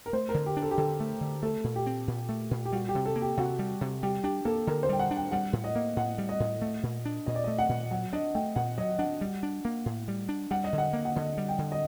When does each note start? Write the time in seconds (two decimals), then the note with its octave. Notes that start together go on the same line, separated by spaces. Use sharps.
0.06 A#4
0.13 A3 C5
0.29 A#4
0.34 D3
0.46 G4
0.57 D4
0.62 A4
0.71 G4
0.78 D3 A4
1.00 A3
1.21 D3
1.43 A3 A4
1.64 A#2
1.76 G4
1.86 C4
2.08 A#2
2.29 A3
2.51 A#2
2.65 G4
2.73 G3 F#4
2.89 G4
2.95 C3
3.05 A4
3.16 A#3
3.22 G4
3.37 C3 F#4
3.59 G3
3.81 C3
4.03 G3 G4
4.23 D4 G4
4.45 A#3 A4
4.67 D3 A#4
4.83 C5
4.89 G3 G5
4.99 F#5
5.11 D4
5.16 G5
5.32 G3 F#5
5.53 A2
5.64 D#5
5.75 A#3
5.96 A2 F#5
6.18 G3
6.29 D#5
6.40 A2
6.62 A3
6.83 A#2
7.05 D4
7.26 A#2 D#5
7.35 D5
7.44 A3 D#5
7.59 F#5
7.69 A#2
7.91 F#3 F#5
8.13 D4 D#5
8.34 A3 G5
8.56 A#2 F#5
8.78 F#3 D#5
8.99 D4 F#5
9.21 G3
9.43 D4
9.65 A#3
9.86 A2
10.08 G3
10.29 D4
10.51 G3 F#5
10.64 D#5
10.73 D3
10.78 F#5
10.93 A#3
11.05 F#5
11.16 D3 D#5
11.38 G3
11.48 G5
11.58 D3
11.72 D#5